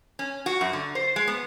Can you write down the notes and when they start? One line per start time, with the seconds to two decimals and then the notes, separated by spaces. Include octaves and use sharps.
0.19 C#4
0.46 F#4
0.61 F#2
0.73 D3
0.95 C5
1.16 G#3
1.27 B3